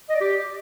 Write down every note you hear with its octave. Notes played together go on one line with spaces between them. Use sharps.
D#5
D5
G4